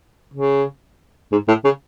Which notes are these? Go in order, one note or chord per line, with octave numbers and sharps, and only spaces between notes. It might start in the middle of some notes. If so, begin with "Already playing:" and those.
C#3
G#2
A2
C#3